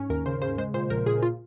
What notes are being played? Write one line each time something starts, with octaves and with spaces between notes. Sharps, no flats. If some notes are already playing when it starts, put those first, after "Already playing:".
Already playing: G#2 C#4
D#2 A#4
C#3 C5
C#3 C5
G#3 C5
A#2 C5
A#1 A#4
A#2 G#4
F4